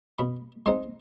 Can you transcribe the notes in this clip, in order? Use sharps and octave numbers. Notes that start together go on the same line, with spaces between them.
B2 B5
G#3 C4 D#4 C6